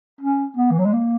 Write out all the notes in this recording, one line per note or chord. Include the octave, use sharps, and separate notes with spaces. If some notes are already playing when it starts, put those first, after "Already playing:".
C#4
B3
E3
F#3
G#3
A#3